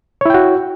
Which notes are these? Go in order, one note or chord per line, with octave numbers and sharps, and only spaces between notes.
E4 F#4 C#5 G5